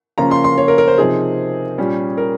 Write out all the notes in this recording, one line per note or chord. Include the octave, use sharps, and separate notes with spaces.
C#3 F3 A#3 C#4 F4 A#5
C6
C6
C#5
A#4
A#4
C5
C3 F3 C4 D#4 G#4
A#2 G3 C#4
A#4